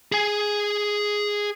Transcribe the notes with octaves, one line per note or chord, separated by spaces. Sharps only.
G#4 G#5